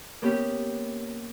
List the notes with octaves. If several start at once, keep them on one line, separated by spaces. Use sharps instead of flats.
A#3 B3 C#4 G4